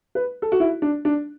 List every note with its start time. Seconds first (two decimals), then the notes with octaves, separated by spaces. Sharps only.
0.15 B4
0.42 A4
0.52 F#4
0.60 E4
0.82 D4
1.05 D4